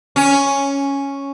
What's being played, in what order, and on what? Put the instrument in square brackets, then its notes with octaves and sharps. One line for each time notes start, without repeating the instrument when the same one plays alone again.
[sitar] C#4